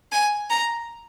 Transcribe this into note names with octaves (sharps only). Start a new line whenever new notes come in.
G#5
A#5